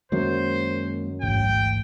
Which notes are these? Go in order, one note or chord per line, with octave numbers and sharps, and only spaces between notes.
F#2 D#3 F#3 G#3 A#3 C5
A1 D2 G#2 G5